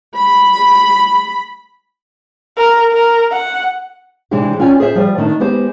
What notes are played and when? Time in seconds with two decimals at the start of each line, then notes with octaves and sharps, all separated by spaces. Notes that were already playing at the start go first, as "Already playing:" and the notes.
0.16 B5
2.57 A#4
2.93 A#4
3.32 F#5
4.31 C3 E3 G#3 D4 E4 G4
4.59 C#4 F4 D5 G5 G#5
4.80 G#4 C5 E5
4.95 F3 G3
5.18 D#3 A3 D4
5.40 G#3 B3 G4 C5